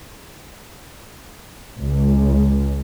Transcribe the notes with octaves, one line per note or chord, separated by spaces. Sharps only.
C#2